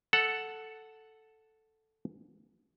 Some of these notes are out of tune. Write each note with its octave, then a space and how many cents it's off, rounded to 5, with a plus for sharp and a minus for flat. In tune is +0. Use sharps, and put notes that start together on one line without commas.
A4 +0 F#5 +0